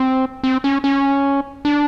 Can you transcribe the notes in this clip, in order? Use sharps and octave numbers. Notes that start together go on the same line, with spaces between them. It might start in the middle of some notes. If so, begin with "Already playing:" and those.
Already playing: C4
C4
C#4
C#4
D4